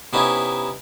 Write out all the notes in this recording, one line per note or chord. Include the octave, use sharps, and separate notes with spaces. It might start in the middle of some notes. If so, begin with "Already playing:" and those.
C3 B3 C#4 D#4 E4